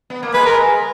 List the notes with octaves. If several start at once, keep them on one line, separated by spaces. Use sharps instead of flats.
B3
A#3
G#3 B4
A#4